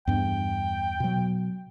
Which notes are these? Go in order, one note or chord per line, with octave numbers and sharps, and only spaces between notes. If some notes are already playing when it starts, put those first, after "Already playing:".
E2 G2 G5
B2 F#3